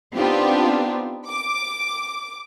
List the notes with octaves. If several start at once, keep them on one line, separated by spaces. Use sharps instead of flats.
B3 C4 D4 D#4 F4 G4
D6